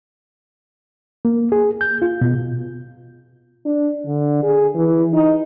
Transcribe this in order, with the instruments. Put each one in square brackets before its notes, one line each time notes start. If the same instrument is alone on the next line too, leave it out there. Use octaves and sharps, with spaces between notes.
[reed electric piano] A#3
G#4
G6
F4
B2
[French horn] D4
D3
G#4
E3
D#4